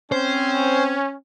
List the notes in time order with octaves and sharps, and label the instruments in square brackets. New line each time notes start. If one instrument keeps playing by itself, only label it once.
[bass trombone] C4 [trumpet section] C#4 [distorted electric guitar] C5